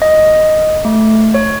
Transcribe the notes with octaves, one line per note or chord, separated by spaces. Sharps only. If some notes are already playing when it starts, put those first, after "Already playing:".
D#5
A3
C#5